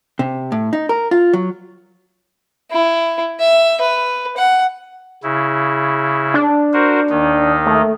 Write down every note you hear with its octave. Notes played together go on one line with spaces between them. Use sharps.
C3
A2
D#4
A#4
F4
F#3
E4
E5
B4
F#5
C#3 E4
D4
F#4 A#4 C5
D#2 D#3 D#4
A3